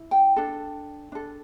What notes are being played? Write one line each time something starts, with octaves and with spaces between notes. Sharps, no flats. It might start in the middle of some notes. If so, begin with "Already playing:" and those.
Already playing: E4
G5
D4 A4
D4 A4